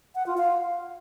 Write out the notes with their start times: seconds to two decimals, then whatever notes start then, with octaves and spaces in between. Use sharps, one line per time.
0.15 F#5
0.26 F4
0.38 F5